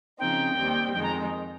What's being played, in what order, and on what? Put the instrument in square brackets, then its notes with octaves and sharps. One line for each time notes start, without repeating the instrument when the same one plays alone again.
[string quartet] C#3 F3 C4 D#4 [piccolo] G5
[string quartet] D#2 D#3 G3 C4
[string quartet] F2 D#3 G#3 [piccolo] G5
[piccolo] A#5